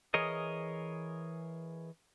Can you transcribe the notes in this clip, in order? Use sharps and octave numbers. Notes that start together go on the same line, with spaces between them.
E3 G#4 A#4 C#5 D#5